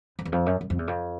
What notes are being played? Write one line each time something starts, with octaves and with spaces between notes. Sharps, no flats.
F2
E2
F2
F#2
F#2
F2
E2
F2